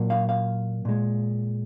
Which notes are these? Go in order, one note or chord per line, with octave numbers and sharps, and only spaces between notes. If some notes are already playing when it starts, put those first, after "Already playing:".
Already playing: A#2 F#3 A#3
F5
F5
A#2 G#3